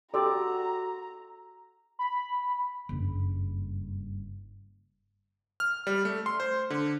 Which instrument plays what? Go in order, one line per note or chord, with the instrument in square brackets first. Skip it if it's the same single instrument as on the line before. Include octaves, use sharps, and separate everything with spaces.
[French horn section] F#4 [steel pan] G4 D5 [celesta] A4 C6 E6 [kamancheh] A#5
[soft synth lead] B5
[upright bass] F#1 G2
[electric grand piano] F6
G3
A3
C6
C5
D3